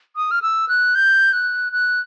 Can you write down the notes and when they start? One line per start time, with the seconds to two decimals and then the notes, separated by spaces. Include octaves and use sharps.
0.16 D#6
0.31 F6
0.42 E6
0.69 F#6
0.95 G6
1.33 F#6
1.72 F#6